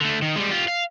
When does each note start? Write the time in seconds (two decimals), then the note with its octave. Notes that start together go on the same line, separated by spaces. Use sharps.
0.01 D3 A3
0.22 D#3
0.36 G3 G#3
0.51 F4 G4
0.68 F5